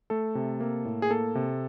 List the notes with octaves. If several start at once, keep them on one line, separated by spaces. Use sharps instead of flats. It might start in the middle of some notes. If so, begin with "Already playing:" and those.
A3 A4
C3
A#3
A2
G#4
A#3 A4
C3